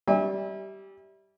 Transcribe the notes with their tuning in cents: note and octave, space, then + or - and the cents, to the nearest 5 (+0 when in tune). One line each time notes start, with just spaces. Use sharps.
G3 -15 E5 -30 G#5 -45